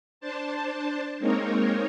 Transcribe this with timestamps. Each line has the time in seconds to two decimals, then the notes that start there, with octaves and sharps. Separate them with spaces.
0.20 D4 C5 A5
1.19 G#3 A#3 C4 D#4 A#4 C#5